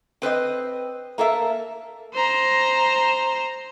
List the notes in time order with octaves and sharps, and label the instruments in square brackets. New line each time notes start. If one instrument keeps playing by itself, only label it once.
[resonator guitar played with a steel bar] C4 B4 C5 D#5
A#3 A4 A#4 E5
[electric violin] C5 A#5